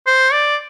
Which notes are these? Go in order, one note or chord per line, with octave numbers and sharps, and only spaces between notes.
C5
D5